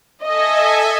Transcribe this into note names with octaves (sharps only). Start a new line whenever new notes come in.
A4 D#5 E5 G#5